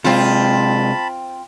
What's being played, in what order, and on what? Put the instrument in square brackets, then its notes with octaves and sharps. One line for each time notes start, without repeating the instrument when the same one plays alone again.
[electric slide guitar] C3 G#3 [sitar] C4 F4 [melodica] A5 B5